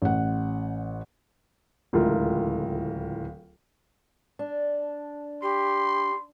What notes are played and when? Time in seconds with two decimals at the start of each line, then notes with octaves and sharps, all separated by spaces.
0.02 A1 F#5
1.93 D1 C#2 E3 A3 F4 A#4
4.39 D4
5.42 G4 C6